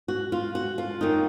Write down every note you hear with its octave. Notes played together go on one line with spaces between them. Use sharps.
F#4
F4
F#4
F4
F#2 D#3 A#3 D#4